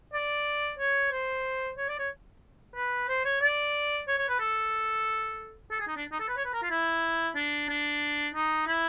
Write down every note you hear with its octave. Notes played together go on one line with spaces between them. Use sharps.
D5
C#5
C5
C#5
D5
C#5
B4
C5
C#5
D5
C#5
C#5
B4
A4
A4
G#4
D#4
D4
D#4
A4
B4
C#5
B4
A#4
F4
E4
D4
D4
D#4
E4